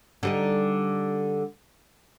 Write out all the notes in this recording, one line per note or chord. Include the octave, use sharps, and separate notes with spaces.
D3 G3 D#4